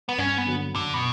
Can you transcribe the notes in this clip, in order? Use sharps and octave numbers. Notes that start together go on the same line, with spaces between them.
B3
G2 C#4
B3
D3 F#3
F#2 D3
B2